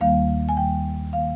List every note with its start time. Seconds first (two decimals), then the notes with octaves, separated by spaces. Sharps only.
0.01 D#2 D#3 G3 A#3 F5
0.49 G#5
0.57 D#2 D#3 G3 A#3 G5
1.13 D#3 A#3 F5